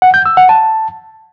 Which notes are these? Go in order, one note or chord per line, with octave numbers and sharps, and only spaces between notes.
F#5
G6
E6
F#5
A5